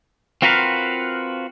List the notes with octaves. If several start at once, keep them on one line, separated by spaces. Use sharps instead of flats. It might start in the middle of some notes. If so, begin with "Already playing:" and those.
C4 F4 F#4 A#4 B4 F5